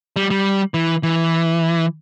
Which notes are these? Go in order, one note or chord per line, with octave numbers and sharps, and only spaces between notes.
G3
G3
E3
E3